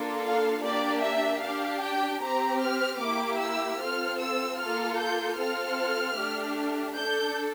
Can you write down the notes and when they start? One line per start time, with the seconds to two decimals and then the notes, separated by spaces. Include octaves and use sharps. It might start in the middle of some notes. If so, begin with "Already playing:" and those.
Already playing: A#3 D4 F4 A4
0.25 F5
0.63 A#3 D4 G4 D5
1.03 E5
1.42 D4 G4 F5
1.82 G5
2.22 C4 G4 A#5
2.61 F6
3.01 A#3 E4 G4 D6
3.40 E6
3.81 C4 F4 A4 F6
4.20 E6
4.58 A#3 F4 A4 F6
4.99 G6
5.38 C4 F4 A4 F6
6.17 A3 D4 G4
6.96 D4 A4 G6